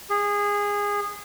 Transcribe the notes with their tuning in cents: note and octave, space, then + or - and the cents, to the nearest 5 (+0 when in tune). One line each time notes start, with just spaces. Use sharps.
G#4 -20